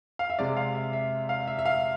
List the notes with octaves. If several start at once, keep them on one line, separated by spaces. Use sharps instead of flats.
F5
E5
C3 G#3 D5
F5
E5
E5
F5
E5
E5
F5